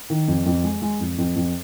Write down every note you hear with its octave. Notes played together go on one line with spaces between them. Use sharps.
D#3
F2
F2
G#3
G#3
F2
F2
F2